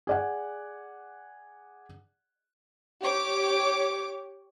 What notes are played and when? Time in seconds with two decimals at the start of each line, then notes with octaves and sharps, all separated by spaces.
0.07 G#4 D5 F#5
3.01 G4 C#5 D6